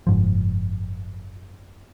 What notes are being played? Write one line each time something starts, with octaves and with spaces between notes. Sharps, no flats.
F#1 G#2 F3